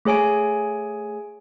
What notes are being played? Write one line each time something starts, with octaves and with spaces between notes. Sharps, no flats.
A3 G#4 C#5 G#5 D7